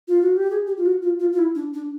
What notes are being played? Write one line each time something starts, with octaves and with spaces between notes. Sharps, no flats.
F4
F#4
G4
G#4
G4
F4
F#4
F4
F4
F4
E4
D4
D4